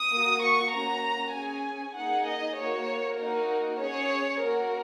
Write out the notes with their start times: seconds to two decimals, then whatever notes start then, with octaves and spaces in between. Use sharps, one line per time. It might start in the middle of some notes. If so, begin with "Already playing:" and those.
Already playing: D#6
0.13 A#3 F#4
0.44 C#6
0.74 A#3 C#4 F#4 A#5
1.36 C#4 G#4 G#5
1.98 A#3 D#4 G#4 F#5
2.28 D#5
2.59 A#3 F#4 C#5
3.21 A#3 D#4 F#4 A#4
3.82 C#4 G#4 C#5
4.44 A#3 F#4 A#4